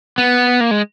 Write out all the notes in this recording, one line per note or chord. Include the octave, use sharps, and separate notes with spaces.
B3
A#3
G#3